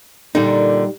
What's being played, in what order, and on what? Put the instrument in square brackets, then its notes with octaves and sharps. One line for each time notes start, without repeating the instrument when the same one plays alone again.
[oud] A#2 D3 [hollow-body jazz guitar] G3 D#4